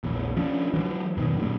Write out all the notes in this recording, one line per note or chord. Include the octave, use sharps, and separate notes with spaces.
A#1 E2
F3 C#4 D4
E3 F#3
F#2 B2 D#3
F#2 A#2